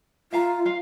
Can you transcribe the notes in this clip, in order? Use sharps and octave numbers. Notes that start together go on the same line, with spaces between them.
F4 E5 F5 A#5
F4 F5